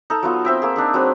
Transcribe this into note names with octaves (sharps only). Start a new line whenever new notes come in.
D#4 A4
F#3 B3 F4
C4 E5 G5
A#3 G#4
D4 D#4 G#4
F#3 C4 B4